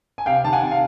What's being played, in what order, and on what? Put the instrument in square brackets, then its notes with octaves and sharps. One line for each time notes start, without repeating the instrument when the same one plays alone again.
[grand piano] G#5
C3 F5 G5
D#3 A5
F#5 G#5
C3
F5